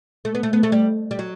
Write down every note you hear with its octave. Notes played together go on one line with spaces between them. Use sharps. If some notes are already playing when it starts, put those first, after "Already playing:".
A3
B3
A3
B3
A3
G3
G3
F#3